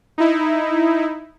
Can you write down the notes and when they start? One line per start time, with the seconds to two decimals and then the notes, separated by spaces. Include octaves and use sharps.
0.18 D#4 E4